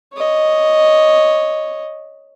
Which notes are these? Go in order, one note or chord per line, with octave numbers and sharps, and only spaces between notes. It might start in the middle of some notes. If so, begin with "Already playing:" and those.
C#5 D#5